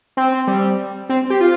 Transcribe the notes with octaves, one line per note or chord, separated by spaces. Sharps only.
C4
G3
C4
G4
F4